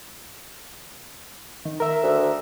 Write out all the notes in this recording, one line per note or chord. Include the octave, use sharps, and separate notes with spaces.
D#3
A#4 E5
D2